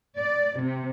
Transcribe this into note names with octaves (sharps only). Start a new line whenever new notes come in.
D5
C3